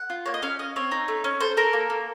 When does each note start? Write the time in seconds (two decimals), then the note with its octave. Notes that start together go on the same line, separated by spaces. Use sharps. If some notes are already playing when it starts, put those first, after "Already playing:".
Already playing: F#5
0.10 F4
0.26 A#3 C#5
0.34 D#5
0.42 C#4 F5
0.59 C#4 D#5
0.76 C4 C#5
0.92 D#4
1.08 A3
1.24 C#4
1.40 A4 C5
1.57 A4 A#4
1.73 A#3
1.90 A#3